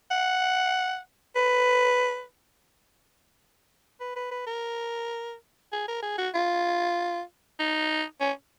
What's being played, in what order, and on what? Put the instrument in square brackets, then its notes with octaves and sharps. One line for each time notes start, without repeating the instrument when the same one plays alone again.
[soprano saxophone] F#5
B4
B4
B4
B4
A#4
G#4
A#4
G#4
F#4
F4
D#4
C#4